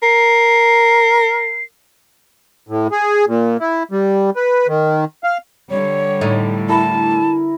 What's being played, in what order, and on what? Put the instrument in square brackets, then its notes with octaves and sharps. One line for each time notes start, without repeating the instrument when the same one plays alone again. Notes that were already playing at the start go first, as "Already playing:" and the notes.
[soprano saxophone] A#4 [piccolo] C7
[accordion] A2
G#4
A#2
E4
G3
B4
D#3
F5
[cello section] D3 G3 [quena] C#5
[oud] A2 D#4
[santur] E4 A#4 [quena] A5